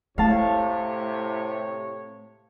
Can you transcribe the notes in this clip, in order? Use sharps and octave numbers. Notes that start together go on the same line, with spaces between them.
A2 C3 A3 C#5 F5 A5